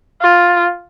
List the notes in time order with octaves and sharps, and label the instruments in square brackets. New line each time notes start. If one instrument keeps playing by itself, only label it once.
[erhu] F4